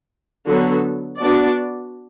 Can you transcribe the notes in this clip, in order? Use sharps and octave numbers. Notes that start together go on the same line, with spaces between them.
D3 F#3 B3 F#4 A4
B3 D4 F#4 D5